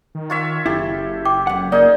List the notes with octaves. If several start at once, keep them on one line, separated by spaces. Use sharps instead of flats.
D#3
F4 C#5 E5
F#1 E4 G4 A4
G5 D6
F#2 F#5
A#3 D#4 G#4 D5